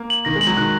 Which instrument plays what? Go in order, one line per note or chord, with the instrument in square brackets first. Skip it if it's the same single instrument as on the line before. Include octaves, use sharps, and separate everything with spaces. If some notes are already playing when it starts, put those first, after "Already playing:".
Already playing: [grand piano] A#3
[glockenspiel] F#7
[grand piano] D#3 [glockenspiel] A#6
[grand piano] G#3
[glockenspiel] F#7
[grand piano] F#3
[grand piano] D#3 [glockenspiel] F#6